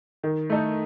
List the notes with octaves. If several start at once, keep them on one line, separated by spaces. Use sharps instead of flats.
D#3
A3 D#4 A4